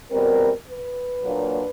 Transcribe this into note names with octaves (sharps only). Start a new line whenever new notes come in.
E2 B2 G3 C4 A#4
B4
A#2 F#3 A#3 D4